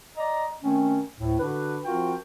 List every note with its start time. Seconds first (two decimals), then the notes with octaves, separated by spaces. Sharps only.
0.17 D5 D#5 A#5
0.63 D#3 A3 C4 C#4
1.19 D2 A2
1.39 D3 D4 F#4 B4
1.85 F3 C4 F4 F#4 A#4 G5